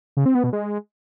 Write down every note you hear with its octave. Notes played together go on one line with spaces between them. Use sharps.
C#3
C4
B3
B2
G#3